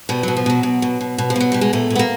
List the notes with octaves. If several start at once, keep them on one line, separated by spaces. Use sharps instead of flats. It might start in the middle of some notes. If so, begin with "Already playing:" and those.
B2 G3
B2 F#3
F3
B2 F#3
B2
B2
B2
B2
F3
B2 F#3
B2 G3
G#3
A#2 A3
A#2
B3
A#3